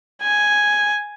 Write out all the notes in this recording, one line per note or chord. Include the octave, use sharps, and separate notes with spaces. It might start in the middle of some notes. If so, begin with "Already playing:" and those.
G#5